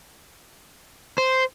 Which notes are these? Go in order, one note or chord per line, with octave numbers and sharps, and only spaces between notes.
C5